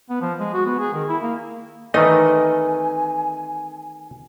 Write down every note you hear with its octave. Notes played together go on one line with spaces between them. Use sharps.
B3
F3
G#3
F#4
B3
G#4
D#3
E4
A#3
D#3 E3 A3 C4 D#4 A#4 D#5 G#5